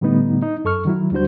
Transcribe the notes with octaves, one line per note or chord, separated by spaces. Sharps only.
A2 D3 G3 A3 B3 D#4
D#4
F#2 A4 C#6 F6
D#3 F#3 E4
D2 G3 D4 F#4 C5 G6